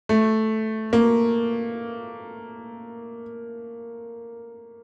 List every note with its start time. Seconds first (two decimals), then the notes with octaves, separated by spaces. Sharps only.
0.09 A3
0.93 A#3